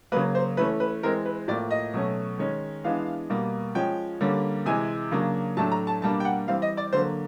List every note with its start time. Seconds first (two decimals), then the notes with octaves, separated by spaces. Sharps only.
0.12 C#3 F#3 A#3 B4
0.35 C5
0.57 E3 A3 C#4 B4
0.80 B4
1.03 E3 G#3 C4 A#4
1.25 B4
1.48 A2 F3 A#3 D5
1.71 D#5
1.94 B2 F#3 A3 C#4
2.39 D#3 G#3 C#4
2.84 E3 G#3 B3 D4 F5
3.30 B2 G3 A#3
3.75 F3 G#3 C#4 G5
4.21 D3 G3 A#3 C#4
4.66 C3 E3 G#3 G#5
5.11 C#3 F#3 A#3 D4
5.57 A2 F#3 A3 D4 A5
5.72 A#5
5.87 A5
6.02 B2 G3 A#3 D4 A5
6.20 G5
6.25 F#5
6.47 E3 G3 C4 F5
6.62 D#5
6.77 D5
6.93 D3 F#3 A#3 C5